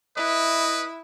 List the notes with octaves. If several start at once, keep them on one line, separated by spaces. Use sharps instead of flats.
E4 B4 D#5